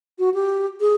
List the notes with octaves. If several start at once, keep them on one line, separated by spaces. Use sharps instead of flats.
F#4
G4
G#4